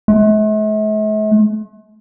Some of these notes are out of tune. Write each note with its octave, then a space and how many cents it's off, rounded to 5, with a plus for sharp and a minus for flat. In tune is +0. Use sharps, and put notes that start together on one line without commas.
A3 -45